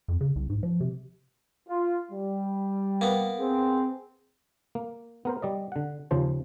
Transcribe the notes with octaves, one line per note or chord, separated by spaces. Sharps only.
F2
C#3
C2
G#2
F3
C3
F4
G3
A#3 B3
C4 G#4
A#3
B3 A#4 C5
G3 D5 D#5
D3 F#5
D#2 C#3 F3 C5 A5